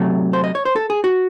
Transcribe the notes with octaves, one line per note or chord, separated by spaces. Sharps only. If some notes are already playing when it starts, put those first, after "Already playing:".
Already playing: C3 F#3 A3
C5
D#5
C#5
C5
A4
G#4
F#4